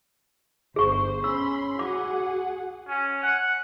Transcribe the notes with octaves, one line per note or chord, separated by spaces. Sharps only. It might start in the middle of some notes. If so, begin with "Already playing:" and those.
G1 G#4 C5 C#6
C#4 B5 C6 E6
F#4 G#4 F#5 D6
C#4
F#5